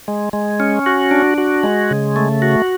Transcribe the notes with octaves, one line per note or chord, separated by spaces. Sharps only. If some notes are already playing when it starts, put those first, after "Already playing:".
G#3
G#3
C#4
F#4
D4
F#4
G#3
C#3
A3
F#4